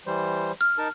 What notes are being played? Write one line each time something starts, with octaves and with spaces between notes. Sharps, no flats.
E3 G3 C5
F6
D#4 A#4 A5